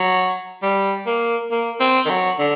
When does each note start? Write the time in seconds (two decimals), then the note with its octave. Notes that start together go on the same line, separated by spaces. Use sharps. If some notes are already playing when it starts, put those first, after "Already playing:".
Already playing: F#3
0.62 G3
1.06 A#3
1.51 A#3
1.80 C4
2.05 D#3
2.09 F#3
2.39 D3